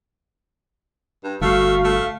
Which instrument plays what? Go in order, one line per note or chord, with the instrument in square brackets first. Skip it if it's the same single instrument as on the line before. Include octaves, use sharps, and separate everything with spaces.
[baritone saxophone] G2
[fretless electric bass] G1 [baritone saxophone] A3 [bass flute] F#4 [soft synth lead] F5
[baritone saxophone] A3